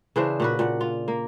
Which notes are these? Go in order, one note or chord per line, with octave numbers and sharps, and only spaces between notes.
C#3 E3 D4 C5
A#2 F#4 B4
A#2 F#5
F4
A#3